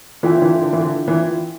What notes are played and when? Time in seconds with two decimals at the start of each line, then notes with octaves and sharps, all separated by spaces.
0.23 E3 F4 A4 E5 G5
0.37 D3
0.42 E3
0.61 D3
0.73 E3
0.79 D3
1.08 E3